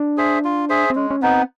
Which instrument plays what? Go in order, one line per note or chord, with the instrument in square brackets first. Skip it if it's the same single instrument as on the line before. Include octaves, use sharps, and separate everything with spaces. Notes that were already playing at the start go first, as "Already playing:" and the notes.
Already playing: [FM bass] D4
[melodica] G#4 C5 E5
F4
G#4 C5 E5
[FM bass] C4
[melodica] G#3 [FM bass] C#4
[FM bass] C#4
[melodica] B3 D#4 [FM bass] C4